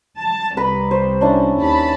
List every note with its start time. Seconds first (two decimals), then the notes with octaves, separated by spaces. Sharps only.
0.18 A5
0.57 C2 B4 A#5 B5
0.91 C5
1.21 C#4 D4 E4
1.60 D#2 A5 B5